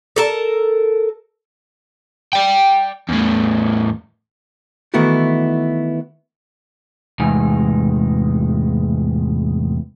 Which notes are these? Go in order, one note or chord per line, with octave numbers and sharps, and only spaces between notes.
A4 A#4 A5
D5 G5
E2 A2
D#3 E3 A3 B3 E4 F#4
E2 A2 C3 G#3 D#4 G#5